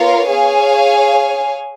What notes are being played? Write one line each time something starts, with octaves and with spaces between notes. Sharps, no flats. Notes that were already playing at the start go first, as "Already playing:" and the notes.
Already playing: B3 F4 A#4 C#5 F5
G#4 C#5 F5 G#5